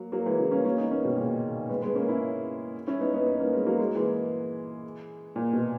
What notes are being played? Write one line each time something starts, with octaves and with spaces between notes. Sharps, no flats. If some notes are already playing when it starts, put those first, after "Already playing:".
Already playing: F#3 A#3
F#3 A#3
E3 G#3
C#3 E3
A#3 C#4
A#3 C#4
B3 D#4
A#3 C#4
B2 D#3
A#2 C#3
G#3 B3
G#3 B3
A#3 C#4
C#4 E4
C#4 E4
B3 D#4
B3 D#4
B3 D#4
A#3 C#4
G#3 B3
F#3 A#3
G#3
A#3
E3 G#3
A#2
B2